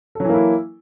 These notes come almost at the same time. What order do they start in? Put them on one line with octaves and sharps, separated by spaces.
A4 F#3 E3 A#3 E4